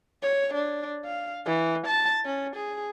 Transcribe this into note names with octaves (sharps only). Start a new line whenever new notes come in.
C#5
D4
F5
E3
A5
C#4
G#4